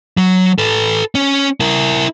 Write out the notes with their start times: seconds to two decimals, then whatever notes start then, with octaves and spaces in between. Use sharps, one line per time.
0.17 F#3
0.58 A4 B4
1.15 C#4
1.60 E4 A#4